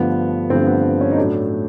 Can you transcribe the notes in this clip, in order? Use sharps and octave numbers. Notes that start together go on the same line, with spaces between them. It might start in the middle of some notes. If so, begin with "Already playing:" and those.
Already playing: G2 D3 F3 A3 B3
G2 D3 F3 A3 C4
B3
C#4
D#4
A2 F#3 A3 D4